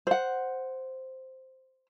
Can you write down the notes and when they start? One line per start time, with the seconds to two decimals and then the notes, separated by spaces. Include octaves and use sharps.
0.07 C5 F#5